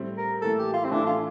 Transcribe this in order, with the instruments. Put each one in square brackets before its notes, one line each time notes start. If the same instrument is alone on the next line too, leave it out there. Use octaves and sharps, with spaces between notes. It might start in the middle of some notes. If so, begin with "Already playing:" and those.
Already playing: [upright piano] A2 G3 C4
[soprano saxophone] A#4
[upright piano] A2 E3 A#3 [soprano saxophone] A4
[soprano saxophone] G4
F4
C4
[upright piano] A2 E3 A3 E4 [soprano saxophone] D4
[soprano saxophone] F4